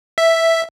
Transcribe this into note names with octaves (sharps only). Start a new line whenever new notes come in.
E5